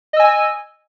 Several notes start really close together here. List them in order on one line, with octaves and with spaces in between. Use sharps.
D#5 E6 G#5